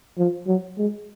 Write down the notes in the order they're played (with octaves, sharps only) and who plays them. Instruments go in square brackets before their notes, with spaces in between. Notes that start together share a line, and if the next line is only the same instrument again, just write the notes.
[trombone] F3
F#3
G#3